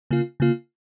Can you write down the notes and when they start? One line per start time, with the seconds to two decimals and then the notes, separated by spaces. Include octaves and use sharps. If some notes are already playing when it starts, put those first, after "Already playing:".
0.11 C#3 A#3 F4
0.40 C#3 A#3 F4